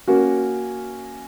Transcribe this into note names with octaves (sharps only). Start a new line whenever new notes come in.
A#3 C#4 F#4